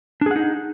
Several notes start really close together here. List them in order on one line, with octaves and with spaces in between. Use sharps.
D4 G#4 F#5 D#4